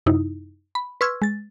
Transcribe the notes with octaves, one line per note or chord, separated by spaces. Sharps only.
F#2 C3 D#4 E4
B5
B4 C6 C#6 E6 F6 G#6
G#3 A6